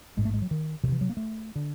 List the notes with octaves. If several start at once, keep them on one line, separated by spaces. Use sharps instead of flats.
A1 G#2 G#3
A3
G#3
F#3
D#3
D2 C3 D#3
E3
F#3
A#3
A3
D3